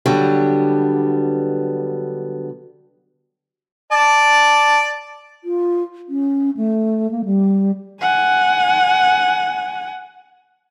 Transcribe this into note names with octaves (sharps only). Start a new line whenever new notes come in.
D3 F#3 G3 B3
D5 A5
F4
C#4
A3
A#3
G3
F#5 G#5